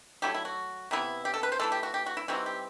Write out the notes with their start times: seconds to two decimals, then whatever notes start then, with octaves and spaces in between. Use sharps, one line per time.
0.22 F#3 A3 E4 G4
0.34 E4
0.45 F#4
0.91 C3 E3 B3 E4
1.25 G4
1.34 A4
1.43 B4
1.52 C5
1.59 E3 A3 E4 A4
1.72 G4
1.83 F#4
1.94 G4
2.06 F#4
2.17 E4
2.28 E3 G3 C4 D#4 F#4
2.46 G4